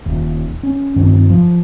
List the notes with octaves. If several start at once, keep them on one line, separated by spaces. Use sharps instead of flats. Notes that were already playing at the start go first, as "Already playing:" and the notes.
D#1
C#4
G2 D#3 C4
F3